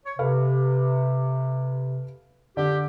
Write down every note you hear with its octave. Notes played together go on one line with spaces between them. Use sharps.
C#5
C3 A4 B4 F5
D3 G4